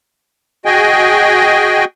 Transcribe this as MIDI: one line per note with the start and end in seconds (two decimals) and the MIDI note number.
0.66 1.85 66
0.66 1.85 68
0.66 1.85 75
0.66 1.85 79
0.66 1.85 80